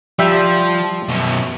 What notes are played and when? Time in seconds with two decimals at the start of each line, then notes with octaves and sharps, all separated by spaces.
0.19 F3 G3 E5 G5
1.09 F#2 B2